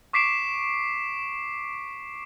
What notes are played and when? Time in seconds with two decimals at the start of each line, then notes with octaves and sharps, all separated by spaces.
0.13 C#6 D6 B6 C7 D7 E7